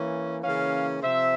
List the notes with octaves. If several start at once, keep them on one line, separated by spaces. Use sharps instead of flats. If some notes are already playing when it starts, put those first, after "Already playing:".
Already playing: E3 A#3 C#4
C#3 E3 A#3 C#4 F5
C3 F3 C4 E5